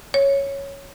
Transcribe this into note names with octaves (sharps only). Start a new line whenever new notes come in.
C#5